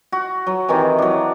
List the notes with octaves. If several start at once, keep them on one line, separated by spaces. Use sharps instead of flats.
F#4
F#3
C3 D#3 E3
F#3 D4